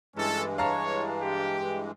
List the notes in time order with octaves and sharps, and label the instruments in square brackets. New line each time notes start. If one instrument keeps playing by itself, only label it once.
[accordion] G2 E3 G#3 [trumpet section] C#4 A4
[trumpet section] C#5 [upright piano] F5 A5 A#5
[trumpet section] G4